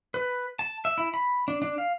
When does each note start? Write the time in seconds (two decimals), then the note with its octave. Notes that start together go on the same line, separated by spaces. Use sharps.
0.14 B4
0.59 A5
0.85 E5
0.98 E4
1.14 B5
1.48 D4
1.62 D4
1.78 F5